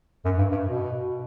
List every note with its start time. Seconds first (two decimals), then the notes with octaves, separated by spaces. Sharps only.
0.25 F#2
0.38 G2
0.52 G2
0.66 B2